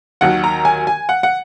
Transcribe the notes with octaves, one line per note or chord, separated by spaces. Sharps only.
D#2 D#3 F#3 F#5
A#5
G#5
G#5
F#5
F#5